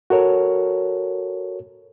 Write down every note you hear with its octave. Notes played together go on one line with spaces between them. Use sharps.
F#4 A4 A#4 C#5